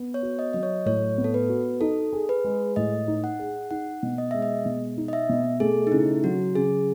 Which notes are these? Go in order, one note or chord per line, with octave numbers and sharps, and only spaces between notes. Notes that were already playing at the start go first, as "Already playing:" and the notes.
Already playing: B3
C#5
F#4
D#5
F#3 D#5
C#5
A2 C#5
B3
A4
B4
F#4
D#4 A4
G#4
B4
G#3
A2 D#5
D#4
F#5
G#4
D#4 F#5
B2
D#5
G#3 E5
D#5
B2
D#4
D#5
E5
B2
A3 G#4
D#4
C#3 E4
F#3 F#4
C#3 G#4